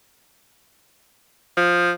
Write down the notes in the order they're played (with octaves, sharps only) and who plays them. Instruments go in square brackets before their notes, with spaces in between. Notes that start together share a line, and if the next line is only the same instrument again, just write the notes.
[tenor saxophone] F3